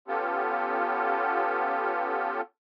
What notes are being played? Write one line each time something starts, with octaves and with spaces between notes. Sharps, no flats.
B3 C#4 F4 G4 A4